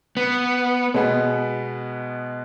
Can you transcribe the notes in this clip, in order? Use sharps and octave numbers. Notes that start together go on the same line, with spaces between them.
B3
B2 G#3 B3